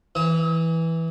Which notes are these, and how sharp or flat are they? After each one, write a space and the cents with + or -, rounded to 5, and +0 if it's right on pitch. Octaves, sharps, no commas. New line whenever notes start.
E3 -5 D#6 +45